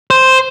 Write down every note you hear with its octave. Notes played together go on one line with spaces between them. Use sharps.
C5